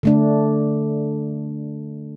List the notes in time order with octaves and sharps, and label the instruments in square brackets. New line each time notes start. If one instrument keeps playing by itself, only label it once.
[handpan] D3 A3 D4